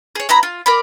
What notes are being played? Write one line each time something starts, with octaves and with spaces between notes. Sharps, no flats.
G#4 C#5
B3 E4 A#5 B5
F4
A#4 D5 B5